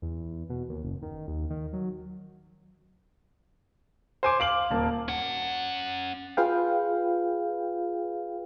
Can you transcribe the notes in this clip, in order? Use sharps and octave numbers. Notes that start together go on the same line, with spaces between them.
E2
B2
D#2
F#1
D#3
D#2
D#3
F#3
C5 G#5 D6
F5 D6 F#7
D#1 A#3 A5
C#4 F#5
F4 G#4 B4 F5 G5